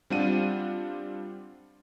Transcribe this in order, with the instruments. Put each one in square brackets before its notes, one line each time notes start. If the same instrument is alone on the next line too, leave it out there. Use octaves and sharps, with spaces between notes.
[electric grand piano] G3 C4 D4 F4 F#5 D#7